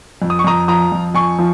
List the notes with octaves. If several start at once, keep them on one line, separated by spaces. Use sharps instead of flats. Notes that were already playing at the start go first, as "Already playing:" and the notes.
F2
D#6
C#6
F2 A#5 D#6
F3 A#5 D#6
F2
F2 G#5 C#6
F3